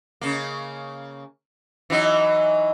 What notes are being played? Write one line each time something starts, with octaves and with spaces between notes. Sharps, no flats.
C#3 A#3
E3 F#3 D#4